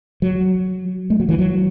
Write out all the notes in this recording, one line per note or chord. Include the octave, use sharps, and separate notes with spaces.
F#3
A3
F#3
E3
F#3